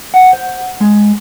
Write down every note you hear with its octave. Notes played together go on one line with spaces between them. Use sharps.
F#5
C5
G#3